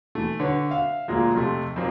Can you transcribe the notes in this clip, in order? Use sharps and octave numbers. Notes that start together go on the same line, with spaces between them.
E3 A3
D3 B4 C#5
E5 F5
D2 A#2 F3 G#3 A#3
F2 C3 A3
F2 A#2 A#3 C4